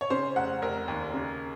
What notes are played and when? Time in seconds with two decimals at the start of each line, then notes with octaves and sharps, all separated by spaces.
0.01 C#5
0.10 C#3 C5
0.36 F1 F#5
0.62 F1 A#4
0.88 D#2
1.14 C#3